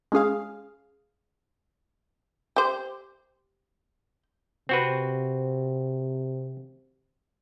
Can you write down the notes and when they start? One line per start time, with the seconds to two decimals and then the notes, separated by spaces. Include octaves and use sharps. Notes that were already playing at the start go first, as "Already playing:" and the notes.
0.12 G#3 C#4 G#4 F5
2.56 G4 C5
4.69 C3 C4 F#4 B4